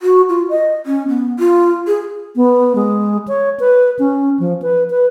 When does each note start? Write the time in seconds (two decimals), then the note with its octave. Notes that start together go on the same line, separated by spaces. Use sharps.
0.02 F#4
0.29 F4
0.50 D#5
0.86 C#4
1.08 B3
1.39 F4
1.87 G#4
2.36 B3
2.75 G#3
3.28 C#5
3.60 B4
3.99 C#4
4.40 F3
4.62 B4
4.90 B4